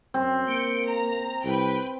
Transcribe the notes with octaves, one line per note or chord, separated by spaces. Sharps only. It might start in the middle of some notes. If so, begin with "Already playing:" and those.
F#2 C4
A#3 G6 C#7 D7
A#5
C2 B4 G5